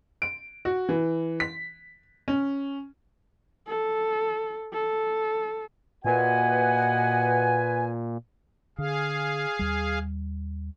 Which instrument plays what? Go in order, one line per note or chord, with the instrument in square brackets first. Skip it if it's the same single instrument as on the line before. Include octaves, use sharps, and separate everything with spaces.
[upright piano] D7
F#4
E3
B6
C#4
[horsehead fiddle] A4
A4
[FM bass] A#2 [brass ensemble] F#4 D#5 F#5 [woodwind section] B4 G#5
[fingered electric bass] D3 [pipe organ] G#4 F5
[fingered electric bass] D#2 G3